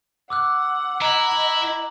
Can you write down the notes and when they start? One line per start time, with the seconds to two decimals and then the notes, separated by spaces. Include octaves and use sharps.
0.30 F#5 D6 E6 F#6
1.02 E4 D#5 A#5
1.31 F#7